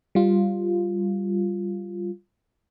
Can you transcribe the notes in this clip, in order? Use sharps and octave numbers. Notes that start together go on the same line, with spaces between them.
G3 F4